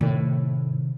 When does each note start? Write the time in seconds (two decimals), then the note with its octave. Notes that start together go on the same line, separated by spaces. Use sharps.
0.01 A2 C3 D#3